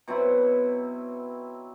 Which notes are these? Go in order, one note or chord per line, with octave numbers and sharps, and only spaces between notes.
B2 F#3 C4 E4